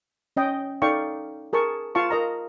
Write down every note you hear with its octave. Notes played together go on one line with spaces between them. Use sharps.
C#4 D#5 G5
D#4 A4 D5 F5 G5 C#6
G#4 A#4 A5 C#6
F4 F5 A5 C#6
A#4 D#5 A#5